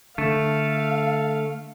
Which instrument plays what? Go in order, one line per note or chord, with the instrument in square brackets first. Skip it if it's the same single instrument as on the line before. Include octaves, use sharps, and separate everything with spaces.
[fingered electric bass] D3 [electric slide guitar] A3 [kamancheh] F5